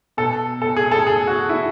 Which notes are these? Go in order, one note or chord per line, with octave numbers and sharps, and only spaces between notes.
B2 A4
A4
G#4
A4
G#4
F#4
E4